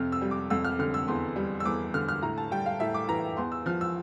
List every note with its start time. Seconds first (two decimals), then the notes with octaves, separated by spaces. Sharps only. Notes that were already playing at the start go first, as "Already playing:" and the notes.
Already playing: F2 C3 F6
0.12 E6
0.22 G3
0.31 D6
0.50 F2 E6
0.65 F6
0.79 D3 F6
0.94 E6
1.08 E2 C6
1.36 G3
1.60 E6
1.65 E2 D6
1.94 D3 F6
2.08 F6
2.22 A2 A#5
2.38 A5
2.51 G3 G5
2.66 F5
2.80 A2 E5
2.94 D6
3.09 E3 A#5
3.37 E2 C6
3.52 E6
3.66 F3 F6
3.81 E6